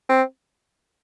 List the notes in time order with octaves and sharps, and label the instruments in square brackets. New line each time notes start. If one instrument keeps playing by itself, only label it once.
[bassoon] C4